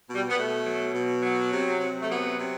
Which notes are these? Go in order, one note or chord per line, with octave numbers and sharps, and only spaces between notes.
B2
G3
B3
B2 A3
F#3
B2
F#3
C3
C3
A3
F#3 B3
C3